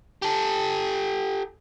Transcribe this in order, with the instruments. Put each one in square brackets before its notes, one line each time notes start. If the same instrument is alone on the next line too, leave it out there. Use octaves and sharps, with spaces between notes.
[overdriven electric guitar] G4 A4